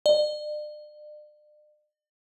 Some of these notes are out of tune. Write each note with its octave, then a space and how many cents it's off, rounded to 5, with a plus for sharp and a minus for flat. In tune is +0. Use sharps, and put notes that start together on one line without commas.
D5 +40